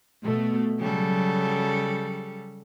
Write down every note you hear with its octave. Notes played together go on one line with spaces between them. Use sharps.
B2 A3
C#3 F#3 G3 A4